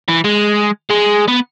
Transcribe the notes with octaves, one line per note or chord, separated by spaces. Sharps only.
E3
G#3
G#3
B3